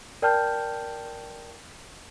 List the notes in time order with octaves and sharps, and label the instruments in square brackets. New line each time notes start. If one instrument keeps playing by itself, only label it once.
[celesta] A#4 D5 G5 A5 F6 G6